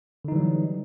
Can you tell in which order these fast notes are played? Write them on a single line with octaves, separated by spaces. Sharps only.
D3 D#4 E3 G3 F#3